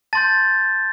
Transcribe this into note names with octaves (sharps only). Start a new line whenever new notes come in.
A5 C6 G6 A6